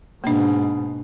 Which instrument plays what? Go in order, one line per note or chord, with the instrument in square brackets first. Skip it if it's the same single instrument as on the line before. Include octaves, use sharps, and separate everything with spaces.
[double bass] G#2 B2 [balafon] A#3 D4